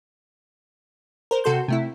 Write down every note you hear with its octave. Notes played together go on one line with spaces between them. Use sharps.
A#4 C5
C3 F#4 A4 C6 G6
C3 A3 E4